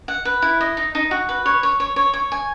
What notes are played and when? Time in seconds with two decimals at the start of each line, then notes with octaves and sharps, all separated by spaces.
0.08 F#5
0.25 B4
0.42 E4
0.61 D#5
0.77 D#4
0.95 D#4
1.11 F#4
1.29 B4
1.46 C#5
1.63 C#5
1.80 C#5
1.96 C#5
2.14 C#5
2.32 G#5